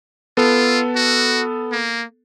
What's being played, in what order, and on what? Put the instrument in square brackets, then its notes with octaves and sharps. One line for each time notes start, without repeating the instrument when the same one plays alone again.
[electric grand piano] B3 A4 [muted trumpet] F4
[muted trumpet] F#4
A#3